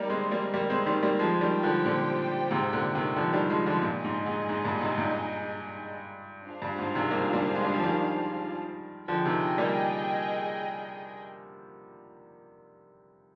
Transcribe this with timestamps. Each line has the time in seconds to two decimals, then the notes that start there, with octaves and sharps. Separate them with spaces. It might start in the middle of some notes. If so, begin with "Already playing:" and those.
Already playing: G3 A#3 D#4 A#4 D5
0.10 G#3 C4
0.31 G3 A#3
0.54 G3 A#3
0.70 G#3 C4
0.86 D#3 G3
1.03 G3 A#3
1.19 F3 G#3 G4 C5 G5
1.34 G#3
1.41 D#3 G3
1.63 D3 F3
1.85 A#2 D3
2.51 G#2 C3
2.73 A#2 D3
2.95 C3 D#3
3.16 D3 F3
3.33 D#3 G3
3.50 F3 G#3
3.66 D3 F3
3.82 G2 A#2 D#4 G#4 D#5
4.04 G#2
4.26 G#2
4.49 G#2
4.64 G2 A#2
4.81 G#2 C3
4.97 G2 A#2
6.46 D4 F4 G#4 C5 F5
6.62 G2
6.78 G#2
6.95 C3 D#3
7.11 G3 A#3
7.33 G3 A#3
7.55 G#3
7.64 G3
7.74 F3
7.84 D#3 G3
9.08 D3 F3 G#4 D#5 G5
9.25 C3 D#3
9.58 G3 A#3